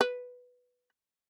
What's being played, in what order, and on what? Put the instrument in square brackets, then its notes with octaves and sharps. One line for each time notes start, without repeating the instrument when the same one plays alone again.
[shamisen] B4